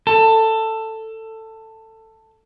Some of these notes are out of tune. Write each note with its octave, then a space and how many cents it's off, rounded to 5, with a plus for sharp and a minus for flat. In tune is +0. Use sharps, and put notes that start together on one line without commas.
A4 +15